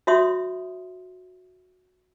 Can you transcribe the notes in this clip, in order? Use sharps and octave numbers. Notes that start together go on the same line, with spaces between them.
F#4 C#5 E5 C6 D#6